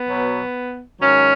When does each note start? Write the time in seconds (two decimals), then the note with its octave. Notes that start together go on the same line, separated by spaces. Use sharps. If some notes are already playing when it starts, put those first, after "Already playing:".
Already playing: B3
0.08 B2 F#3
1.00 G#2 D#3 F#3 C#4